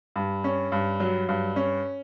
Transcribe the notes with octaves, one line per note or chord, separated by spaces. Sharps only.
G2
C#4
G2
F#3
G2
C#4